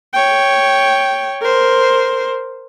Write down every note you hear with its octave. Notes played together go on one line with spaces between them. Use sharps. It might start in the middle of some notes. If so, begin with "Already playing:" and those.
C#5 G5
A#4 C5